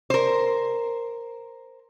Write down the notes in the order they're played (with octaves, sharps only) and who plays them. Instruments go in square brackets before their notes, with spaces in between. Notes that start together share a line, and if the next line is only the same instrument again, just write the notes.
[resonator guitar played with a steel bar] A#4 C5